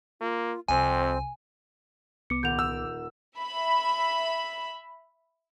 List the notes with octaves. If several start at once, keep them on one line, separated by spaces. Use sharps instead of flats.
A#3 F4
C2 F2 C4 G#5
C2 B3 D6 C#7
D#1 F#5 G6 F7
E6
E5 B5